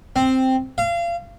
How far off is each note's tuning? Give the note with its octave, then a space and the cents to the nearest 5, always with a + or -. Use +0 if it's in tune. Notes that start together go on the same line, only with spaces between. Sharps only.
C4 +0
F5 -30